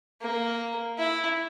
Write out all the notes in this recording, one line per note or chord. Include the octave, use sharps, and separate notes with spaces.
A#3
E4